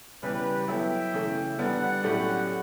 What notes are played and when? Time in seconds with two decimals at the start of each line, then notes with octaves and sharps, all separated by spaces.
0.22 E2 C#3 E3 G3 G4 B4
0.68 F#3 B3 E4 A4 E5 G5
1.14 C#3 E3 A3
1.59 E2 D3 G3 B3 D5 F#5
2.04 A2 F#3 A3 C#4 G4